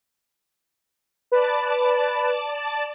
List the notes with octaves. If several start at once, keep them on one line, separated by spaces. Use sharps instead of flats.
B4 D5 A5